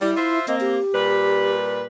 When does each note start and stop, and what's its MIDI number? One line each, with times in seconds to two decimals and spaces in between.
0.02 0.11 55
0.02 0.39 64
0.17 0.44 65
0.17 0.44 72
0.17 0.44 76
0.48 0.79 58
0.48 0.79 60
0.48 0.56 75
0.61 1.56 67
0.95 1.85 46
0.95 1.85 55
0.95 1.85 71